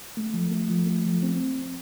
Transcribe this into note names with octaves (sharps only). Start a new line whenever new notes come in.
A3
F3
A3
F3
A3
F3
C4